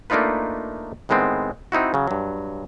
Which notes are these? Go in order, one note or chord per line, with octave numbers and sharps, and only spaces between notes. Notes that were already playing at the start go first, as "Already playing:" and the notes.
A3 A#3 D4 D#4 F4 B4
A2 D#3 G#3 B3 C4
C4 D#4 E4 F#4
C#3 F#3
G2 F#3